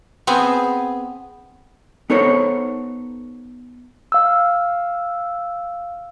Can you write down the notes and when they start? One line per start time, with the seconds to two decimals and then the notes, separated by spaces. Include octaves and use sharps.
0.27 B3 C4 G#4
2.10 B3 D#4 A4 C5 C#5
4.12 F5 E6